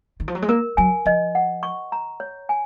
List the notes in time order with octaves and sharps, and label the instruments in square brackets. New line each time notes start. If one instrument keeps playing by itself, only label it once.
[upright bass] D#3
F3
F#3
G#3
[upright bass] A#3 [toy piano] A#4
[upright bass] F#3 [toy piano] G#5
[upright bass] F3 [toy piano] D#5
[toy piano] F#5
C#6
A#5
C#5
G#5